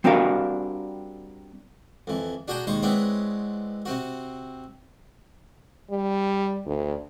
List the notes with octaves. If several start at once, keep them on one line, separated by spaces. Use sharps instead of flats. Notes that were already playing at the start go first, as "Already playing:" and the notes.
G3 C4 D4 F#4 A#4 F5
F2 E3
D4 F#4 G#4 G5 A#5
D#2 G#3 C5 C#6
G#3 B3 C4 D4 E4 C#5
C3 C4 F#4
G3
D2